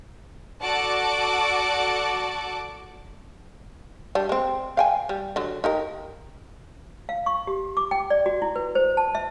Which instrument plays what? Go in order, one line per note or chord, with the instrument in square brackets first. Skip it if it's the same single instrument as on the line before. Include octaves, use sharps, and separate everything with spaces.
[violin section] F#4 A4 D5 F#5 A5 D6
[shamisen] G3 D4
G#3 C4
F5 G5 G#5
G3
D3 F#3
D#4 G4 A#4
[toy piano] F5
C#6
G4
D6
G5
D5
F#4
E4
B4
C5
A5
E5